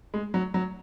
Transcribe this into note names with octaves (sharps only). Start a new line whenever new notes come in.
G#3
F#3
F#3